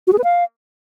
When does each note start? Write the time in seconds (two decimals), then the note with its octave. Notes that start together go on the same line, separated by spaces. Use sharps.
0.07 F#4
0.13 G#4
0.18 B4
0.24 F5